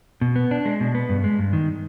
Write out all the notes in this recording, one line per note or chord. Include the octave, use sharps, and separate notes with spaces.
B2
B3
D4
G#3
B2
B3
G2
G#3
G2
D#3